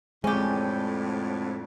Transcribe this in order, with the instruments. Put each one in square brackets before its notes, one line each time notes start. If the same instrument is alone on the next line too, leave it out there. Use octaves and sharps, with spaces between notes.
[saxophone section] F2 A2 D3 [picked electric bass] G#3 [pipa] C#4 G4